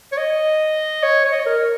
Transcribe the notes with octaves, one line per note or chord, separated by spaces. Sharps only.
C#5
D#5
C#5
C#5
D#5
C#5
A#4